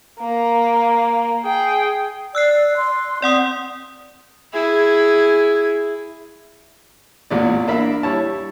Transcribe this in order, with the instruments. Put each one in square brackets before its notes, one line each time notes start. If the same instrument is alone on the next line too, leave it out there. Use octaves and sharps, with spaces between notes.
[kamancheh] A#3 A#4
G#4 G5
[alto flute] D5 [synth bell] E6 F#6 C7
[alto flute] C6
[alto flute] C4 [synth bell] D5 F#5 D#6
[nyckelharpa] E4 G#4
[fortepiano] A1 E2 A#2 D5
A#3 D4 A#4 E5 B5
G3 E4 C#5 A5